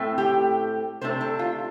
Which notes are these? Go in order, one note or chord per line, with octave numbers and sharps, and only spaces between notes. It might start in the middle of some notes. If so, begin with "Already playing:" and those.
Already playing: A2 A3 C4
G4
C3 A3 D4 C5
A4
F4